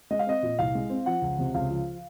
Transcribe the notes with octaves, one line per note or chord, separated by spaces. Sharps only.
G#3 D#5
F5
C4 D#5
A#2
C2 F5
G#3
C4
F3 F#5
C#2
C3
C#2 F5
F3